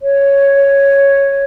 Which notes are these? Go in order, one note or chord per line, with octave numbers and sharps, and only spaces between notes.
C#5